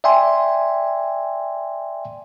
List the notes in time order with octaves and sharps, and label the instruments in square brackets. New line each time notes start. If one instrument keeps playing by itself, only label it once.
[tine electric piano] D5 E5 G5 G#5 C6